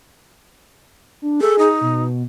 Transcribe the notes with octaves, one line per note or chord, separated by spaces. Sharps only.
D4
G#4 A4
D#4
B2